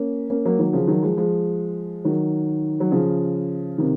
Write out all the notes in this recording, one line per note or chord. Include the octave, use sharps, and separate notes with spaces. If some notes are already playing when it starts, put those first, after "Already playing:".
Already playing: A#3 C#4
A#3 C#4
F#3 A#3
D#3 F#3
C#3 F3
D#3 F#3
F3 G#3
F3 G#3
D#3 F#3
F#3
C#3 F3
C3 D#3